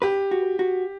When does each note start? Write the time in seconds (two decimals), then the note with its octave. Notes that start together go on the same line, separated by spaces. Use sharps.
0.02 G4 B4
0.31 F#4
0.59 F#4